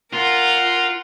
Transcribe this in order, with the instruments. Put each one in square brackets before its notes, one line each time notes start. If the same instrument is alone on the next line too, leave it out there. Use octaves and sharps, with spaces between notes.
[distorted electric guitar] F4 [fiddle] A#4 F#5